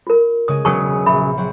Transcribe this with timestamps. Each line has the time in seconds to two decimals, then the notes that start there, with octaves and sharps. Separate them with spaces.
0.07 F4 A#4
0.48 C#3 G#3 G#5 D#6
0.65 E1 C#3 F#3 B3 G#4 C#6 D#6
1.06 A#1 E5 B5
1.37 F#3 C4 F#4